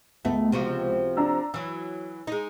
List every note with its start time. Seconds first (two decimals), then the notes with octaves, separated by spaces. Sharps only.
0.25 C#2 A3 B3
0.52 C3 F3 F#4
1.17 D4 A#5 E6
1.54 E3 F#3 E6
2.27 G#3 D#4